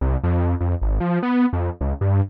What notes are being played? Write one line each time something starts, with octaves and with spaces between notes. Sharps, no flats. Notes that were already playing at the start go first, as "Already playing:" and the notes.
C2
F2
F2
G#1
F3
B3
F2
C#2
G2